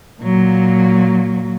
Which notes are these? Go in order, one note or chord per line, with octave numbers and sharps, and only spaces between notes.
A#2 F#3